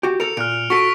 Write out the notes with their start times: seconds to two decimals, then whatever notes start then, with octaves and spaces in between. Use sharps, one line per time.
0.03 F#4 G4
0.20 A4 A#4 C#7 F7
0.37 A#2 F6 F#6 D7
0.70 F#4 A4 C#6 B6 D7